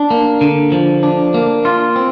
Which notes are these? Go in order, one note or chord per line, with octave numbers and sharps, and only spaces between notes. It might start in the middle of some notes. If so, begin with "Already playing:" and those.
Already playing: D4
A#3
D3
F3
D4
A#3
F4
C4